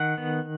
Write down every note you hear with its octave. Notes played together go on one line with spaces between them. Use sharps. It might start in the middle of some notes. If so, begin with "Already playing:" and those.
Already playing: D#3 F#5
B3